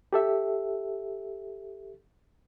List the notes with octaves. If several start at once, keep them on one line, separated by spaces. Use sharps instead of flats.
G4 A4 E5